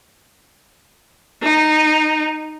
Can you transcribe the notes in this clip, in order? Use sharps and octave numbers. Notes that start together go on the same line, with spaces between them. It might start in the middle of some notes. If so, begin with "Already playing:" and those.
D#4